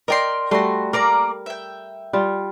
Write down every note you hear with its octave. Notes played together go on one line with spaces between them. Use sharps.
A#4 D5 D#5 G5 C6
G3 A3 F#4 C6
A#3 A#4 D5 F5 A#5
E5 G5
G3 F4